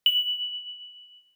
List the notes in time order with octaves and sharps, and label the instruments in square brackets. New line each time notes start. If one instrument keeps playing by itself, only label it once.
[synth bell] F#7